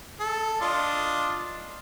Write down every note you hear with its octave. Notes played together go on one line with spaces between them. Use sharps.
A4
D4 F4 D#5